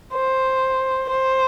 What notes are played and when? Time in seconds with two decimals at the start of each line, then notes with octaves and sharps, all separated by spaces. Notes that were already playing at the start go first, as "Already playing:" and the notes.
0.13 C5
1.10 C5